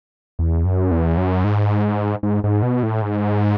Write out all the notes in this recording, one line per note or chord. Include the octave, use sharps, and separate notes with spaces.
E2
F#2
E2
F#2
G#2
G#2
G#2
B2
A2
G#2